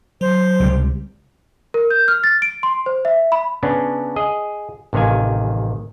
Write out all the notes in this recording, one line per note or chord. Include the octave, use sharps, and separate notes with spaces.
F#3 C5
C#2 C3 G3
A#4
G6
F6
A6
D7
C6
C5
E5
B5
C#3 B3 C#4 D4
G#4 D#5
A1 C3 D#3 F5 G#5